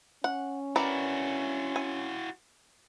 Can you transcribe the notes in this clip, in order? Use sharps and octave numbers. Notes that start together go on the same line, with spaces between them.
C#4 F#5
E4 F#4 A#4 B4 D5
G#5